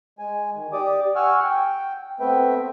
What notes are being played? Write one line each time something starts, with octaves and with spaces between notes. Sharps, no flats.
G#3 G#5
D#3
G4 D5 D6 D#6
F#5 G#5 C#6 E6 F6
G5
A3 B3 C4 B4 E5 G5